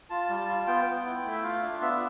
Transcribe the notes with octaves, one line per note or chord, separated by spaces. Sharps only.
F4 A5
G3
F4
B3 G5
B3
E4
A3
E5
F4 F5
D4
B3 E5